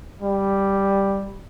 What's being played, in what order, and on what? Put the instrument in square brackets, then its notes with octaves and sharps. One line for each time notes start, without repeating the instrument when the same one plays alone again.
[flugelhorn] G3